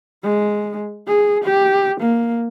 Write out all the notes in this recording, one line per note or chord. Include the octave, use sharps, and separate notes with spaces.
G#3
G#4
G4
A#3